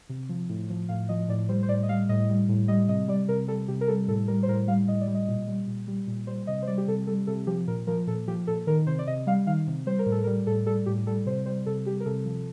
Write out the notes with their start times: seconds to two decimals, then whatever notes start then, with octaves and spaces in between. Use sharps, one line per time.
0.09 C3
0.29 F3
0.49 A2
0.70 F3
0.89 A2 F5
1.09 F3 D#5
1.28 A2 D5
1.49 G3 C5
1.63 C5
1.68 A2 D5
1.83 D#5
1.89 G3 F5
2.09 A2 D#5
2.29 G3
2.49 A2
2.68 G3 D#5
2.88 C3 D#5
3.08 G3 D5
3.28 C3 A#4
3.48 G3 A4
3.68 C3 G4
3.81 A#4
3.88 G3 A4
4.08 A2 A4
4.28 G3 A#4
4.43 C5
4.48 A2 A#4
4.68 G3 F5
4.88 A2 D#5
5.01 D5
5.07 G3
5.15 D#5
5.28 A#2
5.48 G3
5.67 A#2
5.88 G3
6.07 A#2
6.27 G3 C5
6.47 C3 D#5
6.62 C5
6.67 G3 D5
6.78 G4
6.88 C3 A4
7.07 G3 A4
7.27 C3 A4
7.47 F3 G4
7.67 A#2 A#4
7.87 F3 A#4
8.07 A#2 A4
8.27 F3 G4
8.47 A#2 A4
8.67 D#3 A#4
8.86 C3 C5
8.99 D5
9.07 C3 D#5
9.27 G3 F5
9.47 D#3 F5
9.67 C3
9.86 G3 C5
9.99 A#4
10.06 A2
10.12 A4
10.24 A#4
10.27 G3
10.47 A2 A4
10.66 G3 A4
10.86 A2 G4
11.07 G3 A4
11.26 C3 C5
11.46 G3 C5
11.66 C3 A4
11.86 G3 G4
12.00 A#4
12.06 C3 A4
12.25 F3